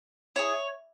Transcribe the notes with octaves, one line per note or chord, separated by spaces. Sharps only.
E4 G#4 C#5